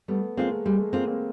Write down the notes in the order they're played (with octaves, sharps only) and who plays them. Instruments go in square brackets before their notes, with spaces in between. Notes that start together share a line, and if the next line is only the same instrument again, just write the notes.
[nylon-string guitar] G3 [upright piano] A3 B3
[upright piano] G#3 A#3 [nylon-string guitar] C4 F4
[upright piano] A3
[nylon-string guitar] G3 [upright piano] G#3
[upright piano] A3
[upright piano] G#3 A#3 [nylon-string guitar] C4 F4
[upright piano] A#3 C4